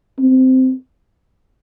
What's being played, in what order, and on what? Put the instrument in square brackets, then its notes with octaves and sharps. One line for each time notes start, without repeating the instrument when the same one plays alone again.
[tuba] C4